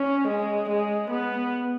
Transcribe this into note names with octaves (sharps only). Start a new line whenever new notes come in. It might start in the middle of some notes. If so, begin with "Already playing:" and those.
Already playing: C#4
G#3
G#3
B3